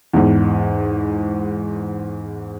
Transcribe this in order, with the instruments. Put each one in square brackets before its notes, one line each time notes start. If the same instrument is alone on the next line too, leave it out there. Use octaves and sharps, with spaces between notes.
[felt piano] E2 G#2